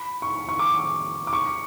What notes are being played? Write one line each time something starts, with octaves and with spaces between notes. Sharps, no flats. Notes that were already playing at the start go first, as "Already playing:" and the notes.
Already playing: B5
C#6
C#6
D6
D6
C#6